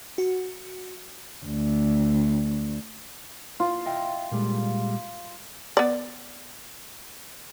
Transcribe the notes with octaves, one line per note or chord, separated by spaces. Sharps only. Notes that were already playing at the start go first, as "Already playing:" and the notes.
F#4
D2
F4
D#5 E5 G5
A#2 G3 G#3
B3 D5